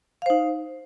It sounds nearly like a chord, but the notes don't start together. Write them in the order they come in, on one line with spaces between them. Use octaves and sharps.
F5 C5 D#4